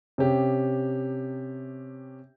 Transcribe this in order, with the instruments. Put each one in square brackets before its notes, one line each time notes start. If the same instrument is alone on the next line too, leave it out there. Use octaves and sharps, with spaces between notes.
[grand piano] C3 C#4 G4